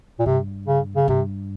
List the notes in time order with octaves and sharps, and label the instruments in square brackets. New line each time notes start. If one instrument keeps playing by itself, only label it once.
[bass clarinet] A#2
[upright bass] G2 [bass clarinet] C3
[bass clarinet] C#3
C#3
[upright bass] G2 [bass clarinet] C3